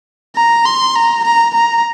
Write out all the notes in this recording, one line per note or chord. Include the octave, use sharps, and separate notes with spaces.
A#5
C6
A#5
A#5
A#5